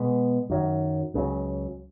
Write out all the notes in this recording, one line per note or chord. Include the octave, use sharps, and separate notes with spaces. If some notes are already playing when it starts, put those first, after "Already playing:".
Already playing: B2 G#3 B3
F#2 D#3 F#3
C#2 C#3 F#3